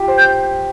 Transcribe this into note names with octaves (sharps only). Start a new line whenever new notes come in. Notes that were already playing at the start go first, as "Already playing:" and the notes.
Already playing: F4 G4
C5
G6